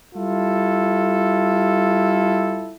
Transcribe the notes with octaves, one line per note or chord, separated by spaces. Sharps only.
G3 E4 F4 A4